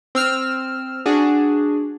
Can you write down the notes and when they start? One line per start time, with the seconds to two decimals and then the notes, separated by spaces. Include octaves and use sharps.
0.15 C4 E6 F6
1.06 D4 F#4 G#4